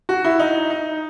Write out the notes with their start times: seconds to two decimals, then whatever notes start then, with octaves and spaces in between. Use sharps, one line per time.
0.09 F#4
0.25 E4
0.39 D#4
0.70 D#4